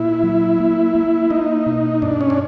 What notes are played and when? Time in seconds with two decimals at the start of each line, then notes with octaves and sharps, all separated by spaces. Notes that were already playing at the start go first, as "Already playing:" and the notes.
Already playing: A#2 E4
0.23 F#3
0.60 A#3
0.95 A#3
1.30 A#3 D#4
1.66 B2
2.02 G2 D4
2.21 C#4
2.30 D4